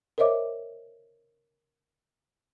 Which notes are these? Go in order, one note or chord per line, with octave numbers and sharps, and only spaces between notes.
A#4 C5 C#5 D#5 E5 D6